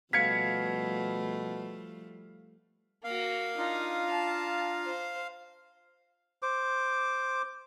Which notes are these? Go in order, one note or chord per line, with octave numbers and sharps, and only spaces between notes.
B2 F3 G3 A3 F5 G#6 B6 C#7
A#3 F#4 F5
D4 D#4 F4 A#5
A5
C5
C5 D6